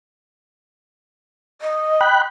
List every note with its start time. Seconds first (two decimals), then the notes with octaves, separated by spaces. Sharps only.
1.61 D#5
2.01 G5 B5 F#6